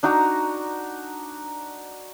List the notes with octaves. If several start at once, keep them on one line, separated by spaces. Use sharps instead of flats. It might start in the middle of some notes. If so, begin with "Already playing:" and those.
D4 D#4 F#4 A#5